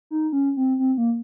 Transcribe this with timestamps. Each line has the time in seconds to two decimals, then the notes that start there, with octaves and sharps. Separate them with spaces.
0.11 D#4
0.33 C#4
0.57 C4
0.79 C4
0.98 A#3